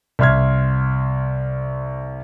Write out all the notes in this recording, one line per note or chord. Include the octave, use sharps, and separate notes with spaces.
C2 E5 C6 F6 G#6